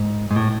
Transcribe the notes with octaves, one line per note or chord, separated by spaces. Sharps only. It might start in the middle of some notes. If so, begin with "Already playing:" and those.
Already playing: G#2
G#2
A2